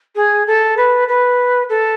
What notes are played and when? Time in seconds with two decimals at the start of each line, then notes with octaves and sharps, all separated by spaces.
0.15 G#4
0.47 A4
0.77 B4
1.08 B4
1.69 A4